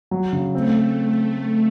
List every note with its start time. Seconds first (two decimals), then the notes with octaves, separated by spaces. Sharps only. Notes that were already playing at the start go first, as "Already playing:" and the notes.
0.11 F#3
0.33 C#3
0.54 A3 C4